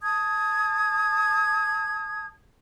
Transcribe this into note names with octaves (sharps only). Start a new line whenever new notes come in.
A5 D#6 G#6